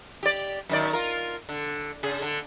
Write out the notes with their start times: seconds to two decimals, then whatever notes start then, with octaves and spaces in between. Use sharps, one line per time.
0.23 G4 D5
0.69 F#2 D#3 D5
0.93 F4 A#4
1.49 D3
2.03 C#3 G#4
2.22 D3